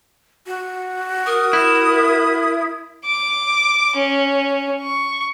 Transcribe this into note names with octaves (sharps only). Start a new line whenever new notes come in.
F#4
A#4 D#6
E4
D6
C#4
C#6